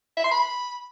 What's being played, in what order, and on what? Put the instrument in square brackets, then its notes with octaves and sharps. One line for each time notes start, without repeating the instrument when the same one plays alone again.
[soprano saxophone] E5
C6
B5